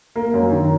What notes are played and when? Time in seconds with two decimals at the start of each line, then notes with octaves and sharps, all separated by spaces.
0.16 A#3
0.34 F#2
0.51 D#3